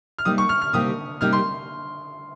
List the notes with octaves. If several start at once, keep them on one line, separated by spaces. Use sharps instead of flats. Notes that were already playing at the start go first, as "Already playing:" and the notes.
F6
C3 G3 A#3 D#4 G4 D#6
C#6
F6
F6
C3 G3 A#3 D#4 G4 D#6
C3 G3 A#3 D#4 G4 F6
C6